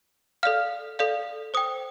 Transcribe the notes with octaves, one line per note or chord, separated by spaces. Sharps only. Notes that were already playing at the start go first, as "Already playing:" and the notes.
A4 D5 F5 F6
A4 D5 F5
C5 G5 D#6